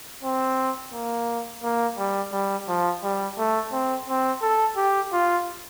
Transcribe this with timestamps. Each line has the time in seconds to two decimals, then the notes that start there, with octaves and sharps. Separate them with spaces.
0.23 C4
0.93 A#3
1.63 A#3
1.98 G3
2.32 G3
2.68 F3
3.03 G3
3.38 A3
3.72 C4
4.08 C4
4.42 A4
4.77 G4
5.12 F4